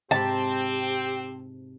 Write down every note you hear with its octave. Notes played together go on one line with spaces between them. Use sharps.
G#2 C3 C4 G4 A5 B5